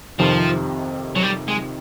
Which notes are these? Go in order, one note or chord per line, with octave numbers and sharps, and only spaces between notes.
F2 C3 D#3 F3
F#3
G3
G#3